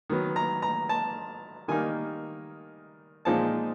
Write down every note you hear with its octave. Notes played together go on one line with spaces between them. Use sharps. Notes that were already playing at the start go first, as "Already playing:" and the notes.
D#3 F#3 B3
A#5
A#5
A5
D#3 G3 A#3 D#4 G#5
A#2 F3 G#3 C4 D#4 A5